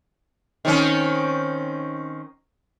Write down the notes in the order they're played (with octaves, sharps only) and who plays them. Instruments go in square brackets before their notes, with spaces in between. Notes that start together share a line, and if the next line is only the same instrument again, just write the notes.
[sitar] D#3 C4 C#4